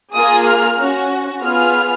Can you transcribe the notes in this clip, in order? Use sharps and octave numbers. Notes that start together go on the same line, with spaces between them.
A#3 F4 G#4 D#6
F6
C#4 F#4
B3 F4 G#4 F6